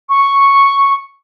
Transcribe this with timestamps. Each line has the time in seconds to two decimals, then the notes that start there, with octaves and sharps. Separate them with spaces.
0.09 C#6